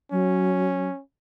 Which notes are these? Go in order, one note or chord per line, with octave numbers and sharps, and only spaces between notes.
F#3 C#4